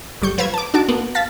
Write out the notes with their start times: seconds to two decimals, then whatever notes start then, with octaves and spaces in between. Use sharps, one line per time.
0.22 G1 G3 C#6 G6
0.38 F3 B4 C5 F5 E6 G#6
0.54 A5 D6
0.74 D4 D#4 F#4 A5 D6
0.88 A#3 B3
1.15 F5 A5 A6 B6